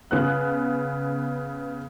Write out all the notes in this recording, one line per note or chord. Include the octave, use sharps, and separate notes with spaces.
C#3 B3 F#6